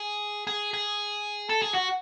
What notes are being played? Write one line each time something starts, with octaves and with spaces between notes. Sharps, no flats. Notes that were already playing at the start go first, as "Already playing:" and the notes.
Already playing: G#4
G#4
G#4
A4
G#4
F#4